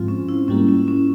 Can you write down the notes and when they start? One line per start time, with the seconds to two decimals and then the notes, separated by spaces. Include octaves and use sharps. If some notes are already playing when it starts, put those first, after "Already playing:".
Already playing: G#2 F3 G#3 C4 F4
0.08 C#4
0.29 E4
0.48 G#2 G3 A#3 C#4
0.68 C#4
0.88 C#4